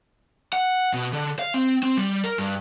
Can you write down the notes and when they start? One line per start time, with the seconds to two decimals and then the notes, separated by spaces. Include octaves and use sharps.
0.53 F#5
0.93 B2
1.13 D3
1.39 F5
1.54 C4
1.83 C4
1.97 G3
2.24 A#4
2.38 G2